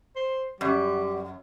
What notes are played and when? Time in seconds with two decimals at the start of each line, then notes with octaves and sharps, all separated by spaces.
0.16 C5
0.61 F#2 G3